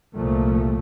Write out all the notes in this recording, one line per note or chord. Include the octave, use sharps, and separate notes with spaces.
C2 A#2 F3 A3